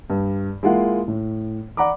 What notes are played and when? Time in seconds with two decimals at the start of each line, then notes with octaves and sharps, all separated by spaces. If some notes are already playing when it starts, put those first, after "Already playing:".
0.10 G2
0.63 G#3 A#3 E4 F4 F#5
1.08 A2
1.77 D5 F#5 A#5 B5 D6